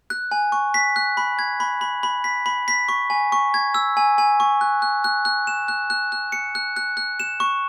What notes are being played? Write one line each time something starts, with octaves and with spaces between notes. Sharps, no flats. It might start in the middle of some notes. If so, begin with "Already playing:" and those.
F#6
G#5
C#6
B6
F#6
B5
G#6
B5
B5
B5
B6
B5
B6
C#6
G#5
C#6
G#6
E6
G#5
G#5
C#6
F#6
F#6
F#6
F#6
E7
F#6
F#6
F#6
C#7
F#6
F#6
F#6
E7
C#6